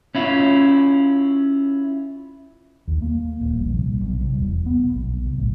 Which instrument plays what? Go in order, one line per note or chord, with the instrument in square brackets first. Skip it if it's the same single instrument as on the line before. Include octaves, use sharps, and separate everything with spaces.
[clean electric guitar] C#4 E4 F4
[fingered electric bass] D#2
A#3
D#1
A#1
C2
B1
C2
E1
B3
B1
C2
A1